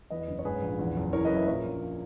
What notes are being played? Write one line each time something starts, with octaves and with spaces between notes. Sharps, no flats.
E2 B4 D#5
F#1
C#5
G#2 G#4 B4
A#1
E2
F#1
E3 A#4 C#5
B4 D#5
F#2
C#5 E5
A#2 A#4 C#5
A#1